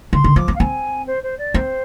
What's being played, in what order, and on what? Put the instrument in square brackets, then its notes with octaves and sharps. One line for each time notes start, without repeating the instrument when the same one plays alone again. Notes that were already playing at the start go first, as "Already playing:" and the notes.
[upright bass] D3 [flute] C6
[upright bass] D3
[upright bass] F3 [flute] D6
[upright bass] C4
[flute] F5
[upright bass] C4 [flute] G#5
[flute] C5
C5
D5
[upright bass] C4 [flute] C5